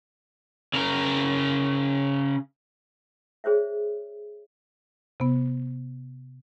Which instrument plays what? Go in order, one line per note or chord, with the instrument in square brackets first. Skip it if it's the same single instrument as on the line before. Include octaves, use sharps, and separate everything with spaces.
[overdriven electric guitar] C#3 A#4
[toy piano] G#4 C5 C#5 E5
[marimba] C3 B3